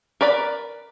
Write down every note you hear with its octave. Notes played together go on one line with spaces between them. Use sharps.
A#4 B4 D5 B5